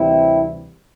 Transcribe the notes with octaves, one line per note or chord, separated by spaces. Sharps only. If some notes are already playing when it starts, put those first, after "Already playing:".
Already playing: D2 C3 E3 G3 C4 E4